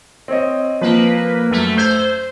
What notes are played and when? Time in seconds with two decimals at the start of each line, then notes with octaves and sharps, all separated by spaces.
0.28 C4 C#5 D#5
0.81 F3 A#3 B4
1.51 F#2 A3
1.77 C5 E6 G6 G#6